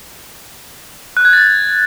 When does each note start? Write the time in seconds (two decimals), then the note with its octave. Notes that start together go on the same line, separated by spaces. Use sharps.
1.17 F#6
1.25 G#6
1.33 A6